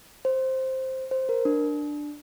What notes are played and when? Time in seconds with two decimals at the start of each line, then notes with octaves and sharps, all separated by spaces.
0.25 C5
1.11 C5
1.29 A#4
1.45 D4